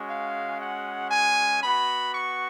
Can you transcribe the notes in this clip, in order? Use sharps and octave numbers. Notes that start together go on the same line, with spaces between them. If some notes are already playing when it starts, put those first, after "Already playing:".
Already playing: G#3 C#4 F#4
F5
F#5
G#5
B3 F#4 B5
C#6